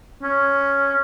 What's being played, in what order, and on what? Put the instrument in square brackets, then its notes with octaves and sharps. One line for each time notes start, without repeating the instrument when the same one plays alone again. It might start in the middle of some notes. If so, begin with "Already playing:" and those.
[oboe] C#4